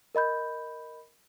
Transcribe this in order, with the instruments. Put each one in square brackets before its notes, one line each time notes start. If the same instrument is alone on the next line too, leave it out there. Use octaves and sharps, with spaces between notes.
[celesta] A#4 D#5 B5 G6